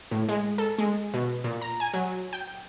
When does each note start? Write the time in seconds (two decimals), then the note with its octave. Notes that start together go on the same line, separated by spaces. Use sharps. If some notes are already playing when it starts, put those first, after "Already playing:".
0.11 A2
0.29 G#3
0.58 A4
0.78 G#3
1.14 B2
1.44 A#2
1.61 A#5
1.80 G#5
1.94 F#3
2.33 G5